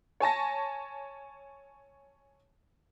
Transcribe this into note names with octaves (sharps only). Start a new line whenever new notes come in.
C#5 G#5 A5 A#6